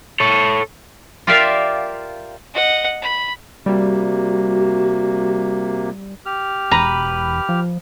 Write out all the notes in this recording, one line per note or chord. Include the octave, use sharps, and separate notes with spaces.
A4 C#5
F4 G4 A#4 D5 E5 F5
D#5 F#5
B5
C3 G3 A#3 F#4
G4 F6
E1 B4 A#5
F3